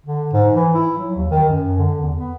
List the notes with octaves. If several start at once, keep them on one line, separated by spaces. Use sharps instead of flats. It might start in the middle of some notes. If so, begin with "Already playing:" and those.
D3
G#2
E3
E4
F#3
D#2
D#3
F#2
D3
E2
B3